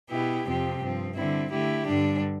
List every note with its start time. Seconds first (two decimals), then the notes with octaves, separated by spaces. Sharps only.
0.09 B2 B3 E4 G4
0.45 F2 C3 F3 C4 G4
0.80 G2 F3 C4
1.15 D3 G3 C4 E4
1.51 D3 A3 E4 G4
1.86 G2 D3 G3 D4